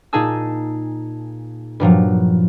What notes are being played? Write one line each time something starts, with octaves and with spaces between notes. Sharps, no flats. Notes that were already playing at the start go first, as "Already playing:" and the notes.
A#2 D#4 G#4 G#5 A5 E6
G2 A#2 F3 F#3